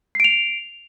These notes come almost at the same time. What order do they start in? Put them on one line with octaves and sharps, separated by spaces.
C7 D7 F7